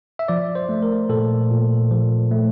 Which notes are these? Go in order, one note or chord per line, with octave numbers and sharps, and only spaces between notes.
E5
F3 D5
C5
A3
A#4
A#2 A4
A#2
F3
A3